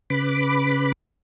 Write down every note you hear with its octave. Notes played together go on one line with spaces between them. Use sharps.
C#3 B4 B5 D6